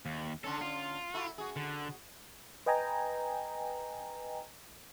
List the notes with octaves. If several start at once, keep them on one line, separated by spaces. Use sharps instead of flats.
D#2
D3 C#4 D4 A4
F4
E4 F#4 A4
F#4 G#4
D3
B4 D#5 G5 G#5 A#5